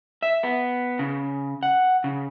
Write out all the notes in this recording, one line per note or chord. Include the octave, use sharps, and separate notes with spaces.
E5
B3
C#3
F#5
C#3